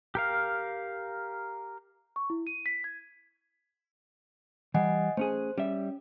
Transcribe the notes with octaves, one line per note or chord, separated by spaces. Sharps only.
G4 A#4 F5
C#6
E4
D#7
B6
G#6
E3 G3 D#5 F#5 G#5
A3 C#4 G#4 C5
G3 C#4 E5